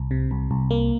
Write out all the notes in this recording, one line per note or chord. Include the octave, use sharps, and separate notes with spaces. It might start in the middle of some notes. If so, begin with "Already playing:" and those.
Already playing: C2
C3
C2
C2
A#3